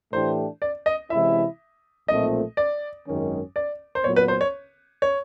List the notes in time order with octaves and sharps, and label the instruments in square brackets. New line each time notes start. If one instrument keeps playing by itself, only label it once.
[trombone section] A2 E3 A3 D4 G4 [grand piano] C5
[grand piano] D5
D#5
[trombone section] C3 E3 G#3 C#4 E4 [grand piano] E5
[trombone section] B1 A#2 F3 A3 C4 [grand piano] D#5
[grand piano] D5
[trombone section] G#1 F#2 D#3 G#3 C#4
[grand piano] D5
C5
[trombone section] A#2 F#3 B3 [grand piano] C#5
[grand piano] B4
C5
C#5
C#5